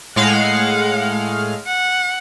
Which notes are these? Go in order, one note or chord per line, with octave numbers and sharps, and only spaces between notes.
A2 G#3 F5 F#5
F#5